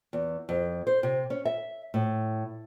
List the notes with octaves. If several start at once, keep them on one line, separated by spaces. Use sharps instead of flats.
E2
F2
C5
C3
C#4
E5
A2